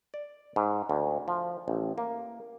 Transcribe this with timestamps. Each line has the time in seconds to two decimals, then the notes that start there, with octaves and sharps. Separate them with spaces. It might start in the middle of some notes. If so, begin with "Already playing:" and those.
0.14 D5
0.56 G#2
0.89 D2
1.28 F3
1.68 A1
1.98 A#3